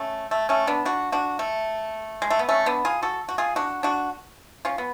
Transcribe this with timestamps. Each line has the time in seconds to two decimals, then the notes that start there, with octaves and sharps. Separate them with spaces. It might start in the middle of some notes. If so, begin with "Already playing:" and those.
Already playing: A3 C#4
0.31 A3
0.49 A3 C#4
0.67 B3 D4
0.85 D4 F#4
1.12 D4 F#4
1.39 A3
2.22 G#3
2.30 A3
2.39 B3
2.49 A3 C#4
2.66 B3 D4
2.85 F4 G#4
3.02 F#4 A4
3.29 F#4
3.38 F4 G#4
3.56 D4 F#4
3.83 D4 F#4
4.65 C#4 F4
4.78 B3